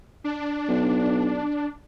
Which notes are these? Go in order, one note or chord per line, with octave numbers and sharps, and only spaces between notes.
D4
B1